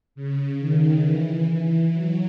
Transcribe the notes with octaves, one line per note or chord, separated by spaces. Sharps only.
C#3
D#3
E3
F#3